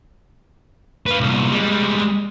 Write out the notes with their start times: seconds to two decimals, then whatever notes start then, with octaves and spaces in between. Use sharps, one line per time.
1.06 B4 F5
1.20 C2 A#2
1.52 G3 G#3